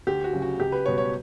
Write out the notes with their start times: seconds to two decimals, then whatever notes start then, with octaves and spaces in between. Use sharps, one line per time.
0.07 D2 G4
0.24 F#4
0.33 C#3 F#3
0.42 F#4
0.59 C#2 G4
0.72 B4
0.85 B2 G3 C#5
0.98 C#5